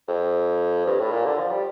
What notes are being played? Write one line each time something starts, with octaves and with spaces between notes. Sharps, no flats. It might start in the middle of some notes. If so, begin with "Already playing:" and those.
F2
G2
A2
A#2
D3
F3
G3